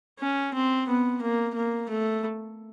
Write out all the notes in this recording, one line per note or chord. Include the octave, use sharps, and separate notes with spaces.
C#4
C4
B3
A#3
A#3
A3